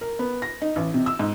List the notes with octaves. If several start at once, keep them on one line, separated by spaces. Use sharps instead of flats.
A#4
B3
A#6
D#4
A1
C3
E6
G#2